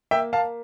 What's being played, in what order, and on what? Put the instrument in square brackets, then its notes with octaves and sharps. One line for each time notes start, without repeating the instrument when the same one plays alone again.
[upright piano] A#3 E5 G5
A#3 F5 A5